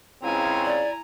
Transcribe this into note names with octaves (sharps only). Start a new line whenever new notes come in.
C#2 C#3 C4 E4 G#5 A#5
D5